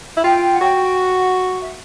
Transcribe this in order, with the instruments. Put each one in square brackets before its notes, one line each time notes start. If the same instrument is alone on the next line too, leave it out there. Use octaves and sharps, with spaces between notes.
[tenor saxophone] E4
[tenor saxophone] F4 [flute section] G5
[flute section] F#5
[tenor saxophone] F#4 [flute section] G5
[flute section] F#5
E5